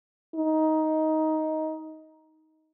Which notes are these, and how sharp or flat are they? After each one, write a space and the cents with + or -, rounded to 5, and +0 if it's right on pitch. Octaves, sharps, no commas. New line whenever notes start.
D#4 +10